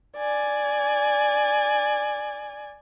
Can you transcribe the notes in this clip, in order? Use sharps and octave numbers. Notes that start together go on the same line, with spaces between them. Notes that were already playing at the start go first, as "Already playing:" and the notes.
D5 G#5